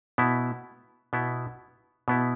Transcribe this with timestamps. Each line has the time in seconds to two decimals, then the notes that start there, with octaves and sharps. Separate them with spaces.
0.18 B2 B3 E4
1.13 B2 B3 E4
2.08 B2 B3 E4